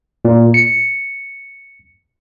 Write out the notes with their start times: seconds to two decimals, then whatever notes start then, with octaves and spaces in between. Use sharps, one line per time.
0.25 A#2
0.54 C#7